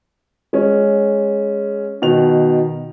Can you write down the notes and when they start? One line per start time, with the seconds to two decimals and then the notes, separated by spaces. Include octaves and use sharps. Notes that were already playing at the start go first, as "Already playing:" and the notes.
0.53 G#3 C#4
2.02 B2 D#3 F7